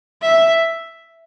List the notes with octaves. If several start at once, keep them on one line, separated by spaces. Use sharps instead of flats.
E5